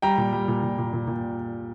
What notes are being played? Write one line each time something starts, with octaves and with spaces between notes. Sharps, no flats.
G3 G5 A#5
A#2
G3
A#2
A#2
A#2
A#2
A#2